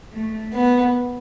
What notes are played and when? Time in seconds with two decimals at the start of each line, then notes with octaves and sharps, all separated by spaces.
0.13 A3
0.53 B3